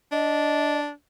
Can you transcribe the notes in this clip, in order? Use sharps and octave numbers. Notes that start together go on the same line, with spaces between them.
D4 D#5